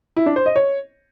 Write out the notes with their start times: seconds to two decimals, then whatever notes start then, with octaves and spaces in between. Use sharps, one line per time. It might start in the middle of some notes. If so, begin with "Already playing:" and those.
0.16 E4
0.26 D4
0.36 C5
0.46 D#5
0.56 C#5